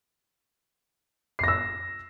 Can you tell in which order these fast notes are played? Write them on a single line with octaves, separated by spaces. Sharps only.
C7 A#6 E6